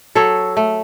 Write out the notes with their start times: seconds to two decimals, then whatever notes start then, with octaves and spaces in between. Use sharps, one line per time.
0.15 F#3 A4 C#5
0.57 A3